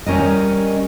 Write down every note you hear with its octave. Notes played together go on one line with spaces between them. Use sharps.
G3 C#4 A#4 D#5